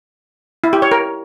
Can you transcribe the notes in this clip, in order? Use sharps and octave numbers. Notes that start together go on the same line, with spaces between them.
E4
G4
C#5
A#4